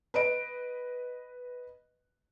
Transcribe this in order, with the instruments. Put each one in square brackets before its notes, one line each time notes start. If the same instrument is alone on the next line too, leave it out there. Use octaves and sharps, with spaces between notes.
[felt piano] B4 D#5 D7